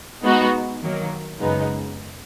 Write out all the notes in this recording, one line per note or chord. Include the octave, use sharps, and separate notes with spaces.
G#3 B3 D#4 F#4
D#3 F#3 A#3
F#2 C#3 G#3 B3 D#4